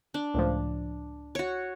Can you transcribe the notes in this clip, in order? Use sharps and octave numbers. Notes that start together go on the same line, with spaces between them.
D4
C#2 A2 F3
F#4 C#5